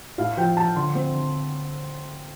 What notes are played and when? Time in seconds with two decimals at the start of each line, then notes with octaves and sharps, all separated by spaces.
0.18 A2 F5
0.37 F3 G5
0.57 F3 A5
0.76 D3 C6
0.95 C4
1.15 D3